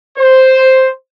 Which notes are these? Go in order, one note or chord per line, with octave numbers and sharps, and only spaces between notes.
C5